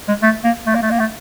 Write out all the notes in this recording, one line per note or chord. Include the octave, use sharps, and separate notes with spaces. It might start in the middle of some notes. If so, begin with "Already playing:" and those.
G#3
A3
A#3
A3
A#3
A3
A#3
A3